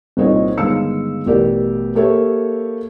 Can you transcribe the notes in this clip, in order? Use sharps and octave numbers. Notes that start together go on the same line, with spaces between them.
C2 A#2 C4 D#4 C#5 D#5
G1 D#3 G#3 F5 E6 C#7
A1 B2 G4 A#4 D5
A#3 G4 A4 B4 C#5 E5